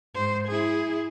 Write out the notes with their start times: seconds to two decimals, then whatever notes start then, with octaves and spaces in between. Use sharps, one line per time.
0.14 G#2 C5
0.47 E4 G#4